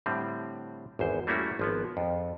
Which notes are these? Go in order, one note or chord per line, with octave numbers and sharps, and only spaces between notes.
A2 D3 G3 C4
G#1 E2 C5
G3 A3 A#3 C#4 E4 F#4
G#1 F3 B3
F2